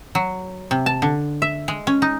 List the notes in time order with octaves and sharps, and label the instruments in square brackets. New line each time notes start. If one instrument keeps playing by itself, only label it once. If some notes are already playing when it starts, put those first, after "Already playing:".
[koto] F#3
C3
A5
D3
E5
G#3
C#4
D#4